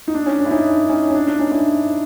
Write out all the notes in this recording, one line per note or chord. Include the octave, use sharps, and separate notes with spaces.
D#4
D4
C#4
D4
E4
C#4 D#4
C#4 D#4
C#4
D4
D4
C#4 D#4
D4 E4